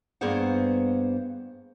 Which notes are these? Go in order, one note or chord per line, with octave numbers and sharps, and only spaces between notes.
G2 A#3 B3 G#4 C5 F#5